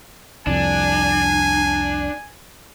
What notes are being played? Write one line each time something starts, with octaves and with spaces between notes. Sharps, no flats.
C2 F2 D4 G#5